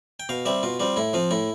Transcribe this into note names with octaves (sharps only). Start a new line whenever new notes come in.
G5
B2 F5
G3 C4 E5
B2 F4
G3 C4 F4
A2 E4
F3 C4 F4
A2 E4